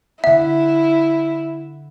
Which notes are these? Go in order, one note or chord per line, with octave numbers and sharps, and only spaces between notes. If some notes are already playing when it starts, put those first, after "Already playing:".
D3 E4 E5 F#5